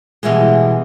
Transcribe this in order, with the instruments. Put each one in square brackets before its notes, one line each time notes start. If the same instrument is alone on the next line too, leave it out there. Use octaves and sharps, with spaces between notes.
[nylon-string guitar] B2 E3 G3 G#3